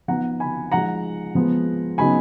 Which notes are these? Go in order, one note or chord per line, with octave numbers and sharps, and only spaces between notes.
F3 B3 D#4 F#5 A#5
G#5 B5
F3 G#3 D#4 F#5 A#5
F3 G#3 B3
C#3 F#3 B3 D#4 G#5 B5